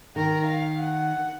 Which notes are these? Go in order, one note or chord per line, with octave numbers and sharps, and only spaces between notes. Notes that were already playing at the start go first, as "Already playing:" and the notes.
D#3 A#4
F5
F#5